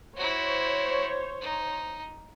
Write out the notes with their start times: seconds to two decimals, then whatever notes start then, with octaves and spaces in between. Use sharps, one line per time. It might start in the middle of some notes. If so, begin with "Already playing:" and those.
0.17 E4 F#4 C5 C#5
1.41 D#4